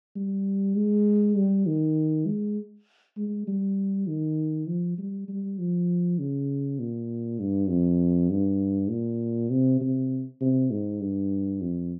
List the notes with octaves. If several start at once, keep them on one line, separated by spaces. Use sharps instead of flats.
G3
G#3
G3
D#3
G#3
G#3
G3
D#3
F3
G3
G3
F3
C#3
A#2
G2
F2
G2
A#2
C3
C3
C3
G#2
G2
F2